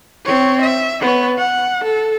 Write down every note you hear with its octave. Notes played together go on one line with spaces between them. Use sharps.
C4 C#5
E5
B3 C#5
F#5
A4